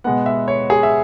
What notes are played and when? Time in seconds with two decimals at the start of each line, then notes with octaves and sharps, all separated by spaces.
0.04 B2 G#3 B3 F#5
0.26 E5
0.48 C#5
0.70 G#4
0.83 E5